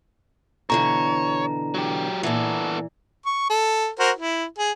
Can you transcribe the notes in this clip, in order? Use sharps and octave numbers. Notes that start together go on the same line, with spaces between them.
B2 D3 E3 C#5 A#5
F#3 G4
A#2 E3 B3 A4
C#6
A4
F#4 A#4 C5
E4
G#4